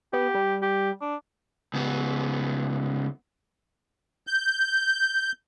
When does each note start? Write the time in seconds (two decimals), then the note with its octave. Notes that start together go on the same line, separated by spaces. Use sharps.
0.13 B3 G4
0.34 G3
0.62 G4
1.01 D4
1.74 C#2 B3
4.27 G6